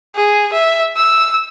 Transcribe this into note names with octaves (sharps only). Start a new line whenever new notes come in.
G#4
E5
E6